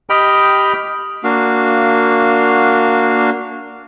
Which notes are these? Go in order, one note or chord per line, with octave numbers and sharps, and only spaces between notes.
G4 D#5 G5 B5 F6
A#3 D4 F#4 F5